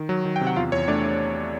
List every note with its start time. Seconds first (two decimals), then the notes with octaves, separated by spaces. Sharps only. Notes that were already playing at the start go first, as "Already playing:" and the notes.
Already playing: D#3
0.09 F#3
0.25 D#3
0.36 G5
0.41 C3
0.47 F#5
0.56 E2 F4 F5
0.72 E2 C#5
0.88 A3 D4 D5